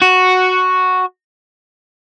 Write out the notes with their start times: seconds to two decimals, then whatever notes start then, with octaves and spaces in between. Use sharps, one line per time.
0.02 F#4